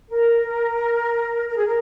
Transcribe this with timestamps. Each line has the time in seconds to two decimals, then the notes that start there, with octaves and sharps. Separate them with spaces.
0.08 A#4
1.48 A#4
1.56 G#4
1.65 A#4